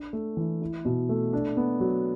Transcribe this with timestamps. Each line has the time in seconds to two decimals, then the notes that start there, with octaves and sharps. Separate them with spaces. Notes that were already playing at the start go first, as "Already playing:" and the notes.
Already playing: D4
0.13 A3
0.37 E3
0.62 E4
0.85 B2
1.09 A3
1.33 D4
1.57 B3
1.80 F#3